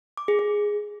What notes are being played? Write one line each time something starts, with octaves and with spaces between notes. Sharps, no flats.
D6
G#4
G#4